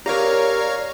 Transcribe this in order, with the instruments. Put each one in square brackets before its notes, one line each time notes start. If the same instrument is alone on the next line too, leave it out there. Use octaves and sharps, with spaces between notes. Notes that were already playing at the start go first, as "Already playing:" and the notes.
[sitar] C#4 [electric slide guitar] G4 A#4 [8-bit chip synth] C#5 F5 A#5 [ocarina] D5